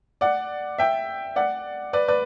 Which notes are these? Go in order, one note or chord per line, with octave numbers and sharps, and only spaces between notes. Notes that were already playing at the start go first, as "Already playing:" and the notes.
D5 F#5
E5 G5
D5 F#5
B4 D5
B4 D5